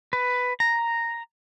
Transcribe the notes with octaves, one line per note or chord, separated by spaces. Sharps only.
B4
A#5